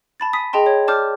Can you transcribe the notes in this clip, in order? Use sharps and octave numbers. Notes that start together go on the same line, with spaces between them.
A5 B5 A6
G#5 D#6 B6
G#4 D#5 G5 A5 C6
C#5
D5 A5 D6 F6 G6